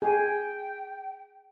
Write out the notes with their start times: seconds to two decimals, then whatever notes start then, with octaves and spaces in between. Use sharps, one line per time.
0.02 G#4 G5